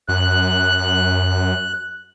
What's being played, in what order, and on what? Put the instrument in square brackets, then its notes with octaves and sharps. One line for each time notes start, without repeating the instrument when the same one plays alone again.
[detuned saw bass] F#2 [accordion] F#6